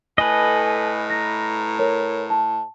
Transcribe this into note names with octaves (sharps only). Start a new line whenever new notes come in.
A2 A4 B4 D#5 G#5
A#5 A#6
A#4 C#5
A5